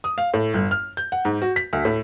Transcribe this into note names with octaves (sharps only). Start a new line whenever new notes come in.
D#6
F5
A2
G1
F6
G6
F#5
G#2
F#4
B6
D2
A2